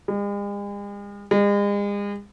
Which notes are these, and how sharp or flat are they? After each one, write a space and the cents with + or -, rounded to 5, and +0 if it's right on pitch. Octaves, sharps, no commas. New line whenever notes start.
G#3 -45
G#3 -40